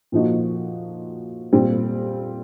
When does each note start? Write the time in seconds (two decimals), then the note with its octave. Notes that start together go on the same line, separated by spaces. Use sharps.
0.12 A#2 F3 A#3 D#4 F#4
1.53 A#2 G3 C4